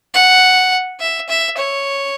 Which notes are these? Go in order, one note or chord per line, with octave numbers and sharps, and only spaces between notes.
F#5
E5
E5
C#5